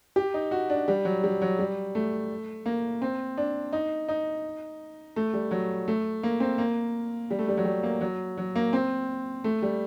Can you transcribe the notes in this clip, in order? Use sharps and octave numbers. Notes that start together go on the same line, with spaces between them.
G4
D#4
F#4
D4
G3
F#3
G3
F#3
G3
A3
A#3
C4
D4
D#4
D#4
A3
G3
F#3
A3
A#3
C4
A#3
G3
A3
G3
F#3
G3
A#3
F#3
F#3
A#3
C4
A3
G3